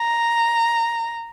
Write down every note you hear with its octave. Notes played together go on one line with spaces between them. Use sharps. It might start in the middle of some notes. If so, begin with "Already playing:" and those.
Already playing: A#5